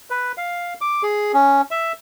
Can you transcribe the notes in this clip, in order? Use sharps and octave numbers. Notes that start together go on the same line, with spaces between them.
B4
F5
D6
G#4
C#4
E5